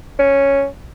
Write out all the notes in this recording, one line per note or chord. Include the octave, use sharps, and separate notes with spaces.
C#4